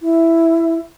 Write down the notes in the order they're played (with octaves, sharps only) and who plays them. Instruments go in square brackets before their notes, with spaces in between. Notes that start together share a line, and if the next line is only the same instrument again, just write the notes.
[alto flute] E4